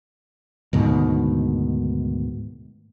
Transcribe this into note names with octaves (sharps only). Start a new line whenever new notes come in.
D2 G#2 B2 D#3